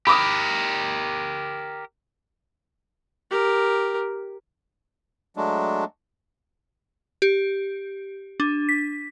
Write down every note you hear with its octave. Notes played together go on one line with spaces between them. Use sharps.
G4 A#4 B5 D6 D#6
G4 A#4
F#3 G#3 A3 D4
G4
D4
B6